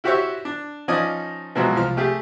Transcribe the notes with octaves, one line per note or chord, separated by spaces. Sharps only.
E4 F#4 G4 C5 C#5 E5
D4
F3 C#4 D#4 D5 G#5 D#6
B2 F3 F#3 G#3 E4 F#4
C2 F3 F6
A3 G4 G#4